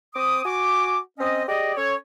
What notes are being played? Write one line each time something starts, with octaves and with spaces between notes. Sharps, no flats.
C4 D6 D#6
F#4 G#5 D6
C4 C#4 D#5
G4 G#4 D5 D#5
C#4 A4 C#5